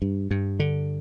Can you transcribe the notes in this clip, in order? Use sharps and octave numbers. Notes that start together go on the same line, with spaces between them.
G2
G2
D3